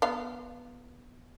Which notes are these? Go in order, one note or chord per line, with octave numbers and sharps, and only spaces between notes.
B3 F5